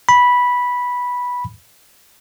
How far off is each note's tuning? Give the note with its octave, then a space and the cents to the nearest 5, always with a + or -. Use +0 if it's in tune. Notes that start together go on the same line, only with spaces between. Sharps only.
B5 -10